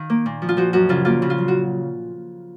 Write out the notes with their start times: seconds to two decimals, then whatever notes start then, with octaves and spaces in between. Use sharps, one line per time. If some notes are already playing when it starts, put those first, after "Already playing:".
Already playing: D#3 F5
0.10 A#3
0.26 A#2
0.42 F3
0.49 F4
0.57 F3 F#4
0.73 F#2 F#4
0.89 C#3 F4
1.05 A#3 F4
1.22 C#3
1.30 F4
1.38 F#3
1.48 F#4